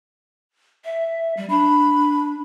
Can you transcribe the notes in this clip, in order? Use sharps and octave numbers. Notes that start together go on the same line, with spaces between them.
E5
G3
D4 B5